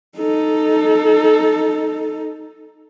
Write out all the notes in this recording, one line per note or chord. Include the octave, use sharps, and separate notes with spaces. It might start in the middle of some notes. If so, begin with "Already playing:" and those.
D#4 A4